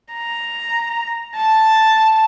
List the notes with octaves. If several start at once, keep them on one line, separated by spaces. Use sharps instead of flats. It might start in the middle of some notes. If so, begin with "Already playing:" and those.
A#5
A5